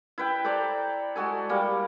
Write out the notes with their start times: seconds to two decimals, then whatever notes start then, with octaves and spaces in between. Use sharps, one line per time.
0.18 E4 B4 G5
0.44 A4 C5 D5 A#5
1.16 G#3 F#4 A4 G#5
1.49 G3 A#3